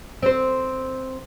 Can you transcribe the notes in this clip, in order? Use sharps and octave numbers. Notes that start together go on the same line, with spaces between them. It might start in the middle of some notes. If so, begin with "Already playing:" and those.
C4 C5